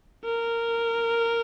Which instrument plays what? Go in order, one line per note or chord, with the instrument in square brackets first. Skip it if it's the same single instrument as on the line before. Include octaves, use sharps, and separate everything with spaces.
[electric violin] A#4